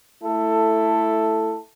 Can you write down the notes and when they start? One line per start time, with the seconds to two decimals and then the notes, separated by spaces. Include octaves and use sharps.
0.23 A3 E4 A4